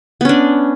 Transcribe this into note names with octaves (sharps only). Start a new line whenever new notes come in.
B3 C#4 D4